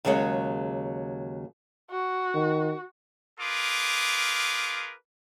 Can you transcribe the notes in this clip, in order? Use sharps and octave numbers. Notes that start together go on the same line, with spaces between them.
D#2 C#3 F#3 G#3 C#5
F#4
D#3
F4 G#4 A#4 B4 D6